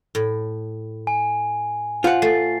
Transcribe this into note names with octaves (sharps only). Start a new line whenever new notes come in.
A2
G#5
F4 C5 F#5
A3 A6 C7